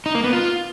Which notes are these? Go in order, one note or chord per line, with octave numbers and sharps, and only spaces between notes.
D#4
A#3
B3
F4